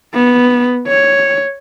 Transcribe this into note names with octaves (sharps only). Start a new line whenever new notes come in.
B3
C#5